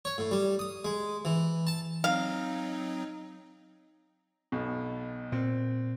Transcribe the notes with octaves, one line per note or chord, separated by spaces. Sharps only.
C#5
A2
G3
D#6
G#3
E3
A5
F#3 C4 D#4 F5
B1 B2
A#2 C4